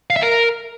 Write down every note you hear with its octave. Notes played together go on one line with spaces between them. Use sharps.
F5
E5
A#4